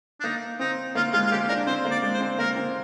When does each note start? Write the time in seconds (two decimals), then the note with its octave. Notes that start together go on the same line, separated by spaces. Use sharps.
0.20 D4
0.23 A#3 D#4
0.59 C4 D#4
0.95 A#3 F4
1.13 G#3 F4
1.27 F4
1.32 A#3 G4
1.49 D4 A#4
1.67 C4 C5
1.85 A#3
1.91 D5
2.02 G#3
2.14 C5
2.20 C4
2.39 A#3 A#4
2.56 C4